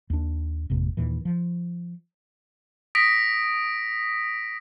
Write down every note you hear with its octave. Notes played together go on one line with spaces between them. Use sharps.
D#2 B3 D4
G#1 F2 C3 A#3
D#2 A#2 E3
F3
D#6 A#6 B6 D7